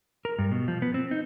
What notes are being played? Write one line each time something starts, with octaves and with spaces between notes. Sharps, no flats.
A#4
G2
B2
F3
B3
C4
D#4